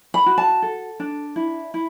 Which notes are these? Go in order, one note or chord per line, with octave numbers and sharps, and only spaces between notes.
B5
F#4
A5
A4
D4
E4
E4